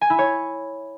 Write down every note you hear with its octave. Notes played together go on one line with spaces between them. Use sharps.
G#5
E4
C#5